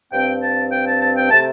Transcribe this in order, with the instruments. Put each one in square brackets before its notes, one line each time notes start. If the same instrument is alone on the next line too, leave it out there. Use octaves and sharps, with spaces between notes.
[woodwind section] G2 F3 C4 G5
A5
G5
A5
A5
G5
C3 A3 A5